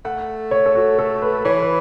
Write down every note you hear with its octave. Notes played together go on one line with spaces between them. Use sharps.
A3 F#5
C#5
A4
F#4
A4
B4
E3 C#5
B4